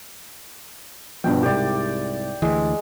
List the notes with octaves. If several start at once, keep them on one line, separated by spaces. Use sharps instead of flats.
G2 B2 F3 G5
C2 G#2 G4 D5
D2 E3 G#3